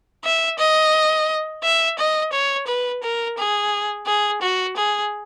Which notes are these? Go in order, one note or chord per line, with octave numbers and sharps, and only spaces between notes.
E5
D#5
E5
D#5
C#5
B4
A#4
G#4
G#4
F#4
G#4